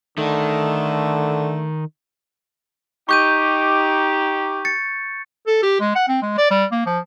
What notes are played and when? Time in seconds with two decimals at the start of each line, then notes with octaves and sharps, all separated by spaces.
0.18 D3 D#3 A3
3.09 D#4 G4 C#6 G6 D#7
4.65 A6 C#7
5.47 A4
5.63 G4
5.81 G#3
5.96 F#5
6.08 C4
6.22 G#3
6.38 D5
6.51 G3
6.72 A#3
6.86 F3